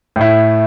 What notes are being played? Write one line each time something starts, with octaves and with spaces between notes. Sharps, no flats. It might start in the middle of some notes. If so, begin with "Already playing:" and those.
A2 A3 E4